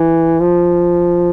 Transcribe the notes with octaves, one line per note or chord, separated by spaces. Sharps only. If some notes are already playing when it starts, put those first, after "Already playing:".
Already playing: E3
F3